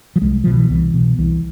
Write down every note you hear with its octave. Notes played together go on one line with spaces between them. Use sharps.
F3
C2 G#3
B2 F3
E3
C2 E3
B2
C2 E3